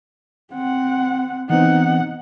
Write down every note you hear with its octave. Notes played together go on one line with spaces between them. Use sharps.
C4 F#5
E3 B3 C4 D#4 F#5